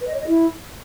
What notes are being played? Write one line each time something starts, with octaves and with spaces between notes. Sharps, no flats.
B4
D#5
C#5
D#5
E4